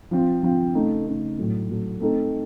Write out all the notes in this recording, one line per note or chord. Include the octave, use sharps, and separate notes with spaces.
F3 C4 F4
F3 C4 F4
C#3 A3 D#4
C#3 A3 D#4
A2 F#3 A3
A2 F#3 A3
A3 C4 D#4 A4